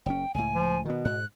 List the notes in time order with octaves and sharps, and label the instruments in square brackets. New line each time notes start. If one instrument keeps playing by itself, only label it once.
[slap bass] F#1 C#4 [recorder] G5
[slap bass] C#2 A2 [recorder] G#5
[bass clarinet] F3
[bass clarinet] B2 [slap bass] D#3 B3
[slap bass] G#2 [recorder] F#6